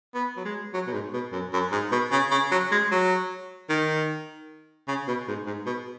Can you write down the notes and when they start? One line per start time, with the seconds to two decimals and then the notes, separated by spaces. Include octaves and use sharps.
0.14 B3
0.37 F#3
0.45 G#3
0.74 F#3
0.87 B2
0.93 G#2
1.13 B2
1.33 F#2
1.53 F#2
1.72 G#2
1.92 B2
2.12 C#3
2.31 C#3
2.52 F#3
2.72 G#3
2.91 F#3
3.70 D#3
4.88 C#3
5.08 B2
5.28 G#2
5.47 G#2
5.66 B2